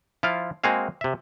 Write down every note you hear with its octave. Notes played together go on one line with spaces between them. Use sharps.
F3 E4 F4 F5
G#3 A#3 C4 F#4 G#4 F5
C3 E5